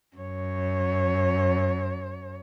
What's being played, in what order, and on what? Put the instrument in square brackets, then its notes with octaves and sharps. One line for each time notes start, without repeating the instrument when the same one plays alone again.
[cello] F#2 C#5